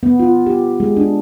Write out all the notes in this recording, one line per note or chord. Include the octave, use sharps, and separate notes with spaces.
B3
F4
G4
G#3
D4